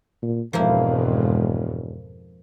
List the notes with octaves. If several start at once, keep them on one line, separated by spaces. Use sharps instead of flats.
A#2
E1 F2 G#2 B2 F3 A#3 E4